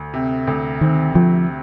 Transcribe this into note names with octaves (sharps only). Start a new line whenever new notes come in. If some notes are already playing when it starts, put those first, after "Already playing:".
Already playing: D2
C3
D2
D#3 C4
D2 F3